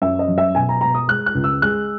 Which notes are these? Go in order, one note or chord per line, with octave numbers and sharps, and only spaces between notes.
F#2 E5
D#5
F#3
E5
B2 G#5
A#5
B2 A#5
D#6
G#3 F#6
F#6
C#2
E6
G#3 F#6